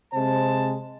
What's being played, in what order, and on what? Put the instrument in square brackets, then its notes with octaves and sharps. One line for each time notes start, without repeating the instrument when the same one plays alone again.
[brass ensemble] C3 G#3 C5 A5